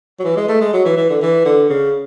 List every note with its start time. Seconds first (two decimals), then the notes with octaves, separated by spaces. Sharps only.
0.20 F#3
0.24 E3
0.37 G#3
0.48 A3
0.61 G#3
0.73 F#3
0.85 E3
0.97 E3
1.10 D3
1.22 E3
1.45 D3
1.70 C#3